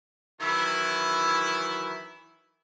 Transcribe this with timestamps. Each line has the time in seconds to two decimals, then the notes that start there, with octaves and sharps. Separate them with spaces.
0.40 D#3 E3 F#3 E4